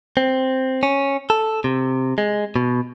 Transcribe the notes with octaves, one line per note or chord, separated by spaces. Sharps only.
C4
C#4
A4
C3
G#3
B2